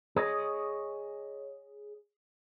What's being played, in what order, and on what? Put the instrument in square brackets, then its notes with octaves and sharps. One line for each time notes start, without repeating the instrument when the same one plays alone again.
[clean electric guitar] G#4 C#5 D#5